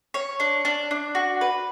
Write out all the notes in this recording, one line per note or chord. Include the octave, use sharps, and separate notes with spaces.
C#5
D4
D4
D4
F#4
B4